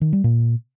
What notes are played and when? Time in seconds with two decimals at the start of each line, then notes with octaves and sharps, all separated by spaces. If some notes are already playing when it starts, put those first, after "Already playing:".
0.01 D#3
0.13 G3
0.24 A#2